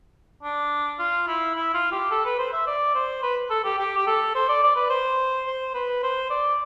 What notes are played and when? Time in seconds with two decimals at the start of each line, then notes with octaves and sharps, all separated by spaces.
0.43 D4
0.99 F4
1.27 E4
1.55 E4
1.74 F4
1.92 G4
2.11 A4
2.25 B4
2.38 C5
2.53 E5
2.67 D5
2.94 C5
3.23 B4
3.50 A4
3.64 G4
3.78 G4
3.97 G4
4.07 A4
4.35 C5
4.48 D5
4.63 D5
4.76 B4
4.90 C5
5.47 C5
5.74 B4
6.03 C5
6.30 D5